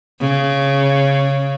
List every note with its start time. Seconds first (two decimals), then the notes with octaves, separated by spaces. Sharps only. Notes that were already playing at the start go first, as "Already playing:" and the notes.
0.21 C#3